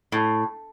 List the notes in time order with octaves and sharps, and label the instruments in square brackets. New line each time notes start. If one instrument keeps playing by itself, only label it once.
[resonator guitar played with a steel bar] A2